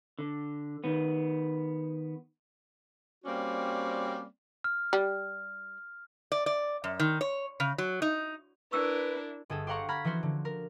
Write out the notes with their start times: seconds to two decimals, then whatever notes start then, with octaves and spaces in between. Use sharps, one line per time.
0.19 D3
0.84 D#3 B3
3.25 G3 A#3 C4 C#4 F#4 D5
4.64 F6
4.93 G3
6.32 D5
6.46 D5
6.84 F#2
7.00 D#3
7.21 C#5
7.60 C#3
7.78 F#3
8.02 D#4
8.72 D4 E4 A#4 B4 C#6 E6
9.50 G1 G#4 A4
9.67 G4 C5 F5 F#5 A#5 C#6
9.89 A#5 B5 F6 G#6 B6
10.04 E3 F3 C#4 F#4 C5
10.23 D3
10.45 A#4